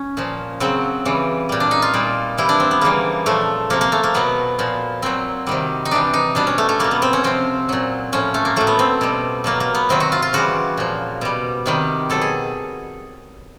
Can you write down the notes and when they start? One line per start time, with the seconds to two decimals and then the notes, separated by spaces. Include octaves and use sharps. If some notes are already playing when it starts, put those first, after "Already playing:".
Already playing: C#4
0.17 A#2 F3
0.60 C#3 F#3 C4
1.05 C#3 E3 G3
1.49 A#2 G3
1.60 D4
1.71 D#4
1.82 F4
1.94 A#2 G3
2.38 C3 E3 G3 E4
2.49 D4
2.60 C4
2.71 B3
2.81 C#3 E3 G3 A#3
3.26 A#2 F3 A3
3.70 C3 F3 A#3
3.81 A#3
3.92 A3
4.04 A#3
4.14 B2 F#3 B3
4.59 A#2 F3
5.02 A#2 F#3 C4
5.47 C3 D#3 G3
5.85 D#4
5.91 C3 E3 G3 D4
6.13 D#4
6.35 B2 G3 D4
6.47 C#4
6.58 A3
6.69 A3
6.79 B2 G3 A#3
6.91 B3
7.02 C4
7.13 C#4
7.24 C3 F3 C4
7.69 A#2 F#3
8.12 A2 F3 C#4
8.34 A3
8.45 A#3
8.56 A2 F#3 A3
8.67 B3
8.79 C4
9.01 B2 G3
9.44 B2 F#3 A#3
9.60 A#3
9.75 B3
9.89 C3 D#3 F#3 C4
10.00 F#4
10.12 F4
10.22 F4
10.33 C#3 E3 G3 F#4
10.77 A#2 F3
11.21 B2 G3
11.66 C3 D#3 G3
12.10 B2 F#3 A4
12.21 G#4